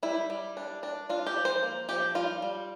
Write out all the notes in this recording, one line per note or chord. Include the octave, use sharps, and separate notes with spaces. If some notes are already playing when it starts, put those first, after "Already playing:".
G3 E4
G3
D4
D4
D4 F4
G4
F3
C5
A#3
F3 G4
G3 F4
G3